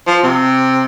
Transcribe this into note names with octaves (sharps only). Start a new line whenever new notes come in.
F3
C3